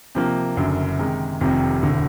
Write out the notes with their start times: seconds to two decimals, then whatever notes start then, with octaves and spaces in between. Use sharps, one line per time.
0.15 C3 F3 A#3
0.56 F#1 F#2 D3
0.98 C3 D#3 G#3
1.41 F1 F2 C3 D#3 G3
1.83 E1 D2 D3